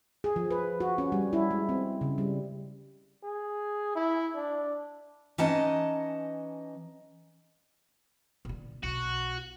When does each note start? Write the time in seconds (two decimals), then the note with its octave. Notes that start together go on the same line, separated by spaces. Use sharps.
0.24 G#4
0.36 F3
0.51 B4
0.80 F#4
0.98 C#4
1.12 G3
1.33 E4
1.51 G#3
1.69 C4
2.01 C#3
2.18 G3
3.24 G#4
3.96 E4
4.35 D4
5.38 E3 C#4 D#4 D#5 F#5 A5
8.45 A#2 D3
8.83 B1 F#4